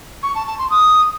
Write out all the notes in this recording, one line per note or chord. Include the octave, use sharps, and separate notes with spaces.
C#6
A5
A5
C6
D#6